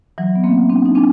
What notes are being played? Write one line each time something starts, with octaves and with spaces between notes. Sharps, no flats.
E3 F#3
B3
A#3 C4
C4 D4
D#4
C4 D4